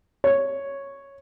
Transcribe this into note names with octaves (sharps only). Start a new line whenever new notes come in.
C#5